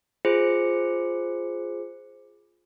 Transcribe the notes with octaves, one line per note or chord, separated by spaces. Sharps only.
F4 G#4 C5 C#7